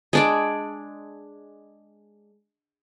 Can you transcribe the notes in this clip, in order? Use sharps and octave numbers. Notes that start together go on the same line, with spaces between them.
G#3 D4 D5